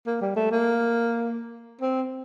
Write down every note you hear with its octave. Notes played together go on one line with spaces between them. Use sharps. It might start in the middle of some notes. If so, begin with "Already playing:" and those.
A#3
G3
A3
A#3
C4